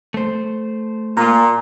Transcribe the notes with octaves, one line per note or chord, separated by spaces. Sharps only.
A3 C5
A#2 A#3 F4 A#5